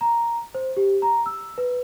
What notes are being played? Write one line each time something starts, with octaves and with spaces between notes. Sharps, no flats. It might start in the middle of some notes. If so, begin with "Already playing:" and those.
A#5
C5
G4
A#5
E6
B4